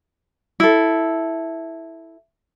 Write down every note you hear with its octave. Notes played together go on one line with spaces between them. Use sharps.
E4 A4